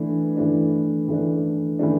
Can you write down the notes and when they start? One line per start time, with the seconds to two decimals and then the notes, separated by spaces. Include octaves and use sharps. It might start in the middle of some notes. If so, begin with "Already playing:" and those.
Already playing: E3 A3 D4
0.37 E3 A3 D4
1.08 E3 A3 D4
1.79 E3 A3 D4